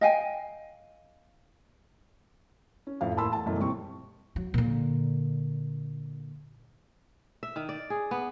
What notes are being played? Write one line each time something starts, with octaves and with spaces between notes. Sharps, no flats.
D#5 F5 G5 G#5
C#4
A1 F2 F5
A1 A#3 A5 B5 C6 E6
E2 A3 A5
F#2 B2 E3 A3
E1 A#1 G3 C4 C#6
F#3
A#2 D3
E5
D#3
D5
G#4
B3